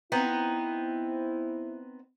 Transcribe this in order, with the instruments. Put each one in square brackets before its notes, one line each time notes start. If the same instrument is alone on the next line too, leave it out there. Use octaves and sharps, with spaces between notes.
[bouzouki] B3 C4 D#4 [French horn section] E4